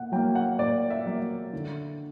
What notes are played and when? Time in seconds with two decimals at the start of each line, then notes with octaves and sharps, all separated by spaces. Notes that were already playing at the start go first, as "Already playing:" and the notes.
Already playing: A#2 F#5
0.12 F#3 A#3 G5
0.35 F#5
0.58 A#2 D5
0.90 E5
1.06 F#3 A#3
1.53 D3